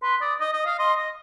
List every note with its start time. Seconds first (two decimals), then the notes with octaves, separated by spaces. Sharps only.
0.01 B4 C6
0.20 D5 D#6
0.39 D#5 D#6
0.53 D#5
0.59 D#6
0.66 F5
0.78 D#5 C6
0.97 D#5 D#6